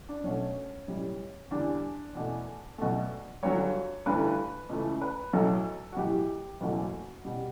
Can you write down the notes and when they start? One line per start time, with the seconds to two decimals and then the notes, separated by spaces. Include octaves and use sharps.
0.09 D4
0.24 B1 B2 A3 C#4
0.88 B1 A2 G3
1.51 E2 D3 G3 D4
2.15 E2 B2 A3
2.78 B1 B2 A3
3.43 G1 G2 F#3 C#5
4.06 G1 G2 E3 A3 B4
4.69 C#2 C#3 E3 A3
5.01 B4
5.33 B1 A2 F#3 A3 A4
5.92 F#4
5.97 B1 A2 E3 G4
6.61 F#1 E2 B2 F#3 A3 F#4
7.25 B2 G3